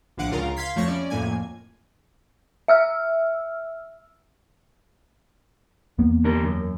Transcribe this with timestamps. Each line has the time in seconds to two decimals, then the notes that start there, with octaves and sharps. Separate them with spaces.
0.18 A#1 A2 D3 F5 F#5 D7
0.31 C#2 C#3 F4 A#4 F5 A#5
0.56 F5 C6 F6 G#6 B6 C7
0.76 F2 F3 A3 C#5 C#6 A#6
0.88 G3 C#4 D5
1.10 F2 A2 A#3 G#5 G#6
2.68 E5 E6 F6
5.98 E2 A#3 B3
6.24 D3 G3 A#4
6.43 F#2